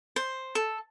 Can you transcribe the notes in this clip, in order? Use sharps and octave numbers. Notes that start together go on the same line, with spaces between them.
C5
A4